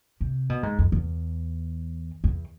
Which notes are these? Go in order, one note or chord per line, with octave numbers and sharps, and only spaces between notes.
C3
B2
G#2
F2
E2
E2